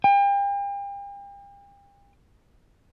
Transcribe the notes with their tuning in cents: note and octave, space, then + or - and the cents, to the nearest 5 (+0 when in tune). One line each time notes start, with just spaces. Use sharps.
G5 +40